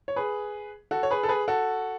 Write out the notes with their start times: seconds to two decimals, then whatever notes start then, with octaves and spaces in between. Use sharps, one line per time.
0.08 C#5
0.16 G#4 B4
0.91 F#4 A4
1.03 C#5
1.11 G#4 B4
1.23 A4
1.29 G#4 B4
1.48 F#4 A4